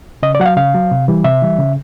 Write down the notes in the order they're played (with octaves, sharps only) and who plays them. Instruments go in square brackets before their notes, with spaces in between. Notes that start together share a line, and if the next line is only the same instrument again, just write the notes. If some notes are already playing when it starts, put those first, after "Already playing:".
[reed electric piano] C#3 D#5
D5
F#3 F#5
F5
C#3 F5
F#3
C3
E3 G3
C3 E5
E3 G3
C#3